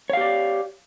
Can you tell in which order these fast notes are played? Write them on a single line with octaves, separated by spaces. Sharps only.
C#5 F5 G4 D5